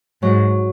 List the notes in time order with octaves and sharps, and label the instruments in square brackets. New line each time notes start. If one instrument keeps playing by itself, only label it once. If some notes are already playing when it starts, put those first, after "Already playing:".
[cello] G#2 [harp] F#3